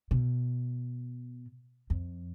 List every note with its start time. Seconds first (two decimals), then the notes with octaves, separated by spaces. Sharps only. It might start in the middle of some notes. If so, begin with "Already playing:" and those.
0.11 B2
1.90 F2